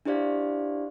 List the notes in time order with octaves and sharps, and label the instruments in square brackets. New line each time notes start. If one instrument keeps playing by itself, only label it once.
[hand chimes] D4 E4 G4 C5 D5 F5